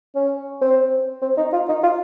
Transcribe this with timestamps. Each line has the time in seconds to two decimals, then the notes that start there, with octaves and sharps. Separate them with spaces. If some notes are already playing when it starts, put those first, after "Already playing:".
0.15 C#4
0.61 C4
1.22 C4
1.37 D#4
1.53 F4
1.68 D#4
1.83 F4